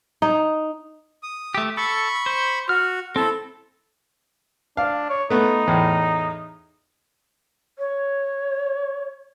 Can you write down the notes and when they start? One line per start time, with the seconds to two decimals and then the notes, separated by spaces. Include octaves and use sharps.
0.22 D#4
1.23 D#6
1.54 A3 G4
1.77 A4 B5 C#6
2.26 C5
2.69 F#4 F6
3.16 C4 E4 A4
4.77 D4 F5
5.10 C#5
5.30 A3 B3 D#4
5.67 E2 A2
7.79 C#5